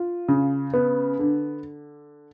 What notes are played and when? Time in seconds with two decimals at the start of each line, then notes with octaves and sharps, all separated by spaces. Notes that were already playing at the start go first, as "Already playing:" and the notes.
Already playing: F4
0.28 C#3
0.74 B3
1.19 D3